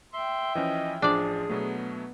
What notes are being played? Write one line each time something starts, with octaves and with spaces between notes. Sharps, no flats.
E5 G5 C6
E3 F3 C#4 D#5
A1 F3 D4 G#4 D5
B2 F#3 A3 B3